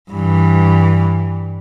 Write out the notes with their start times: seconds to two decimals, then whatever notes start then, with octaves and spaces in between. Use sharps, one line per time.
0.11 G2 E3